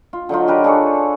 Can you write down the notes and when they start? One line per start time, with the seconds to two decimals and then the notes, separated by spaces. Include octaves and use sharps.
0.13 F4
0.29 D3 F#3 D#4 F4
0.48 G4 A#4 B4
0.64 D4 G#4 A4 C#5